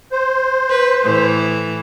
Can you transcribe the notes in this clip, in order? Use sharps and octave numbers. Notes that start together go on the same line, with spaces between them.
C5
B4
A2 E3